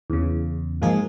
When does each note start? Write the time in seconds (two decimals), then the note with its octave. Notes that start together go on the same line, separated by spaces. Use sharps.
0.10 E2 C#3
0.82 G#2 F3 G#3 A#3 G#4